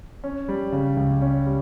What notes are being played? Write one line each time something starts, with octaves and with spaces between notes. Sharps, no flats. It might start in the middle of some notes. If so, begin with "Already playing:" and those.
C#4
G3
C#3
C#2
C#4
G3